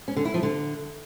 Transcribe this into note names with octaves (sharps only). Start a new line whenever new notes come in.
C#4
D3
E4
F3
D3